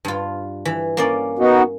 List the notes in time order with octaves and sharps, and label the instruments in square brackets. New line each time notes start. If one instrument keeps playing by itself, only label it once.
[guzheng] G2 F4
E3
A#3 C#4 D5
[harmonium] B3 D#4 F#4